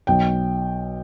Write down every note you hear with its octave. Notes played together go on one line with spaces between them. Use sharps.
B1 G5